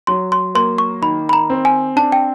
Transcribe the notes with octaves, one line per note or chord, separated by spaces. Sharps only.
F#3 C6
C6
A#3 C6
C#6
D#3 B5
B5
A#5
C4
G#5
D4 A5
G5